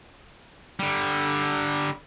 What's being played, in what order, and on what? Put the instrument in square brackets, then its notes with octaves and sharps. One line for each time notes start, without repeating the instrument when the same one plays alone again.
[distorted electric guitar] D3 G3